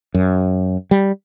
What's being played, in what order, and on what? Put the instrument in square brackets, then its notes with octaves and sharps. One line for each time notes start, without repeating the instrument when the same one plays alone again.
[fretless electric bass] F#2
G3